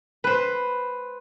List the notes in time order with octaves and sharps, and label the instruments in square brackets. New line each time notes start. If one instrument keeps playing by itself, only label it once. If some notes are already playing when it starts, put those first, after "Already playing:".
[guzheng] B4 C5